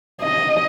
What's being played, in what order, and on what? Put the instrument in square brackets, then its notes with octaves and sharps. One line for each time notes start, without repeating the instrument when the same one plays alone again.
[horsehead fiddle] D#5